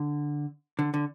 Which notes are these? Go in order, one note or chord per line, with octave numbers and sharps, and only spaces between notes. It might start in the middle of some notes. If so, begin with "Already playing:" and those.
Already playing: D3
D3
D3